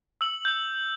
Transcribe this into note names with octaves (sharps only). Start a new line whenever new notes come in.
E6 F#7
G6 F#7